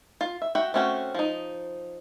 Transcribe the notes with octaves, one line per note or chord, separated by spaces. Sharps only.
F4
E5
F#4 E5 F#5 G5
A3 C4 C#4 F#4 G5
F3 D#4